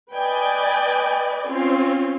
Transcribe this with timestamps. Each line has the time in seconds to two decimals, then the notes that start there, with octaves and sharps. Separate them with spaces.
0.13 B4 D5 D#5 G5 G#5
1.47 C4 C#4 F4